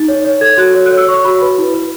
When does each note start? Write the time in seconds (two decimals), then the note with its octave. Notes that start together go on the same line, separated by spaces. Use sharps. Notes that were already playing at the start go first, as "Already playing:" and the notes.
Already playing: D#4 A6
0.08 C#5
0.25 C#5
0.41 A4 G#6
0.58 F#4 F#6
0.75 C#5
0.86 C#5 F#6
0.97 E6
1.07 C#5 C#6
1.25 F#4 B5
1.42 B4
1.58 E4
1.74 B4